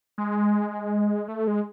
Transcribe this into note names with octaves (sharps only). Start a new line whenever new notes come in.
G#3
A3
G#3